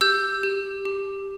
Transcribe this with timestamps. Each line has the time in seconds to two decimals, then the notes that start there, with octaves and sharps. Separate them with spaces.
0.01 G4 E6 G6
0.43 G4
0.85 G4